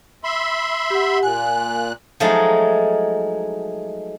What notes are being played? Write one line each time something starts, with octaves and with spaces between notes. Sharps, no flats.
E5 B5 C6
G4 F#5
A#2 G#5 F#6
F3 F#3 G#3 A3 D#4